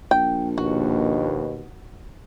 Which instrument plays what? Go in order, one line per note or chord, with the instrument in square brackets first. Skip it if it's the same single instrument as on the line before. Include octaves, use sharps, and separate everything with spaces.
[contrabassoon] A#1 [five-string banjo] G5
[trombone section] D#2 B2 [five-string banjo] F#4